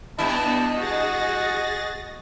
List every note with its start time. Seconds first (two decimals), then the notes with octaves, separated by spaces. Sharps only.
0.19 G2 B3 D4 E4 D#5 A5
0.78 F#4 G#4 A6 A#6